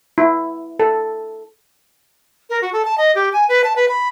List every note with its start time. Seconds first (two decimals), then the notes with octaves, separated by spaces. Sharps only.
0.18 E4
0.79 A4
2.50 A#4
2.62 F#4
2.73 A4
2.85 A5
2.98 D#5
3.15 G4
3.33 G#5
3.49 B4
3.64 A5
3.76 B4
3.88 B5